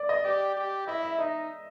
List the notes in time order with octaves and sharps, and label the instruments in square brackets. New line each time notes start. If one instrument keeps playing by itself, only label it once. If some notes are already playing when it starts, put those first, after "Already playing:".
Already playing: [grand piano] D5
D#5
[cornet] G4 [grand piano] D5
[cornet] G4
[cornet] E4 [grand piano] D#5
[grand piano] E5
[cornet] D#4 [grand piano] D#5